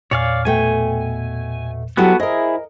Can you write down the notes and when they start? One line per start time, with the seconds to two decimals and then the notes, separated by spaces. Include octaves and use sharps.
0.11 E2 A#2 C#5 D5 F5 G#5
0.45 B2 A3 G5 G#5
1.97 F#3 B3 E4 F#4 G4 A4 F#6
2.20 E4 G#4 A#4 C5 D#5